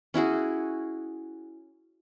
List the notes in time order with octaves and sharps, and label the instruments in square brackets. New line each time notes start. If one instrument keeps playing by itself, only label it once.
[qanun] C#4 E4 F#4 G#4